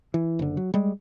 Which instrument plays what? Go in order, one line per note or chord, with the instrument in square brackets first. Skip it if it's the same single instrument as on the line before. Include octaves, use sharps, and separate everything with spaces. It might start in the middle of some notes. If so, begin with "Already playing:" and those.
[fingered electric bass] E3
F#1 D3
F#3
G3 G#3